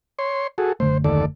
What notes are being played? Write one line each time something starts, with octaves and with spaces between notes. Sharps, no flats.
C#5 C6
F#4 G#4 A4
F#1 D3 A3 C5
D#2 A4 D5